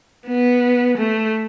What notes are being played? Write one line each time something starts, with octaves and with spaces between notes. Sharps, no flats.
B3
A3